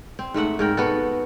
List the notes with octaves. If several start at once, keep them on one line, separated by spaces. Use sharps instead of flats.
C4
G#2 A3 E5 F#5
G#2 A#4 G5
B3 F#4 A4